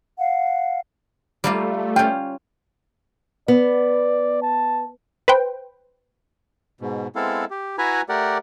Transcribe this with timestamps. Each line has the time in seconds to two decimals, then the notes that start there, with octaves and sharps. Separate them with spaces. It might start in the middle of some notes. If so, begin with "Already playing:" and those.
0.18 F5 F#5
1.44 G3 A3 A#3 F4
1.96 C#4 F4 G5
3.48 B3 D5
4.42 A5
5.28 B4 C5 G5
6.81 G#2 B2
7.16 G#3 B3 C4 E4 A4 F5
7.51 G4
7.78 E4 F#4 B4 E5 G#5 A#5
8.09 A3 G4 A#4 D5 F#5